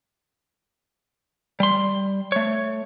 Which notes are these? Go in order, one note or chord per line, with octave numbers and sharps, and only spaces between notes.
G3 C6
A3 C#5